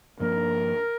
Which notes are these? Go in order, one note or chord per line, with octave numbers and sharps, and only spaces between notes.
G2 F3 A#3 D4 A#4